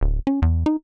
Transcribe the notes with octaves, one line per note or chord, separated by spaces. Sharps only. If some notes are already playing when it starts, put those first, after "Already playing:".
D1
C#4
E2
D#4